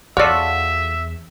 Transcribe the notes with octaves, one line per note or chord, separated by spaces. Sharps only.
E2 F4 F#4 A4 C#5 D5 E5